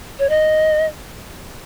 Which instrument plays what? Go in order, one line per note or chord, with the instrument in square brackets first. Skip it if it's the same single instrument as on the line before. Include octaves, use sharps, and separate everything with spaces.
[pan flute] C#5
D#5